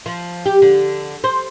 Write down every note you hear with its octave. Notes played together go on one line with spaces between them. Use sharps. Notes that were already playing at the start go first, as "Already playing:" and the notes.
F3
G4
D3
C5